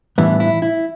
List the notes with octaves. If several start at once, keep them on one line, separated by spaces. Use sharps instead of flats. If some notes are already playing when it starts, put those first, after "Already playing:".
A2 E3 G3 B3 D4 E4
E4
E4